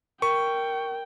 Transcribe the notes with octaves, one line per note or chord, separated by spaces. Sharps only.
A#4 G5 C#6